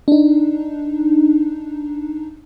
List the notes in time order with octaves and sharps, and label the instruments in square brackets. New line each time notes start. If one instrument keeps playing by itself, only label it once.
[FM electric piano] D4 D#4